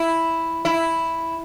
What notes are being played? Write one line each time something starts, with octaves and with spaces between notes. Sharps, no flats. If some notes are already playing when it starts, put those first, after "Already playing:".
Already playing: E4
E4